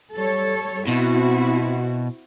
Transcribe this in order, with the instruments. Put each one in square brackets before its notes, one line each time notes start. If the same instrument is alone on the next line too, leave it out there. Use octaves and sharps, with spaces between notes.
[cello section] G3 A4 C#5
[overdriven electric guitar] B2 [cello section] C4 E4 F#4